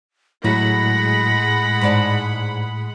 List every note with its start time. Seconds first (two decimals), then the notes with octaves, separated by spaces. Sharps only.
0.44 A2 F#3 G#3 F#5 B5 A#6
1.81 G#2 D5 A5